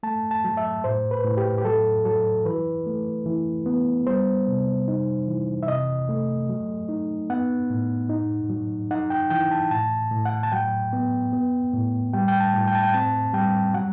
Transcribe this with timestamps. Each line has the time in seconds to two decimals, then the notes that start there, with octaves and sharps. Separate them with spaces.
0.03 A3 A5
0.31 A5
0.44 F#3
0.57 E5
0.84 A2 C5
1.11 B4
1.24 A2
1.37 G4
1.58 G4
1.65 F#3 A4
2.05 F#3 A4
2.45 E3 B4
2.86 A3
3.26 E3
3.66 B3
4.07 G3 C5
4.48 C3
4.88 D#4
5.28 E3
5.63 E5
5.67 C3 D#5
6.09 A3
6.49 F#3
6.89 D#4
7.30 B3 F#5
7.70 A2
8.09 D#4
8.50 F#3
8.91 D#4 F#5
9.10 G5
9.30 E3 G5
9.51 A5
9.71 A2 A5
10.11 A2
10.26 F#5
10.43 A5
10.52 F#3 G5
10.93 B3
11.33 B3
11.74 A2
12.13 G3 G5
12.28 G5
12.40 A5
12.53 A2
12.68 G5
12.75 A5
12.83 G5
12.94 C4 A5
13.34 G3 G5
13.74 F#3 F#5